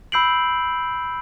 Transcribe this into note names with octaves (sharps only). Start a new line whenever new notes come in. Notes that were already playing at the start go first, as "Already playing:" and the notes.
B5 E6 G6 C7 D7 F#7